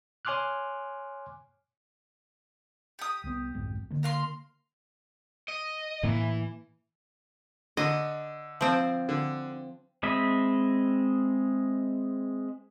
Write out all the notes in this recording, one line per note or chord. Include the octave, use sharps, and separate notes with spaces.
C#5 G#5 C6 D6 F6 F#6
G4 D#6
C2 B3
B1 F2 G#2
D3 A#3
A#4 F5 C6
D#5
A2 E3 A#3
D3 D#5
F3 C4
D3
G#3 C4 D#5 E5 B5